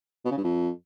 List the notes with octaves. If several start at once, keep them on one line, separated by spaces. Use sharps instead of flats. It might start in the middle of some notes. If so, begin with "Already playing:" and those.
B2
C#3
G2
F2